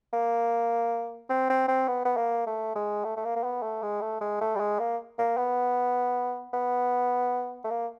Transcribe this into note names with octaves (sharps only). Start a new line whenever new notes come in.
A#3
C4
C4
C4
B3
B3
A#3
A3
G#3
A3
A3
A#3
A#3
B3
A3
G#3
A3
G#3
A3
G3
G#3
A#3
A#3
B3
B3
A3
A#3